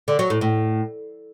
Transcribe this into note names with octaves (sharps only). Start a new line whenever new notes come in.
D3
F#3
A2
A2